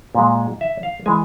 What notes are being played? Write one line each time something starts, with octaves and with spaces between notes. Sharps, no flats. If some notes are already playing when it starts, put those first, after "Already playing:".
A#2 G#3
E5
F5
E3 G#3 G#5